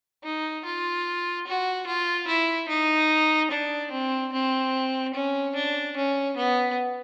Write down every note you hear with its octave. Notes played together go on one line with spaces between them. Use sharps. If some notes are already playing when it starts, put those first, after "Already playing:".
D#4
F4
F#4
F4
E4
D#4
D4
C4
C4
C#4
D4
C#4
B3